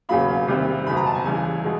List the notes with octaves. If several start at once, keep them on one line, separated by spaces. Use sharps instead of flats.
E1 E2 C#3 F#3 A#3 B5
C2 C3 D#3 G3
F#1 E2 B2 B5
A#5
A5
G#5
C#2 C#3 E3 G3 G#5
B2 G#3